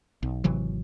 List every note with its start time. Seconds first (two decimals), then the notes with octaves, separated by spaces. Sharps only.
0.23 B1
0.44 G#1 C3 E3 F#3